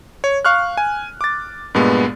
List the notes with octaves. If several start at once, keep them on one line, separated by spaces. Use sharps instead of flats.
C#5
F5 C#6 F6 F#6
G#5
D6 A6
G2 A#2 G#3 B3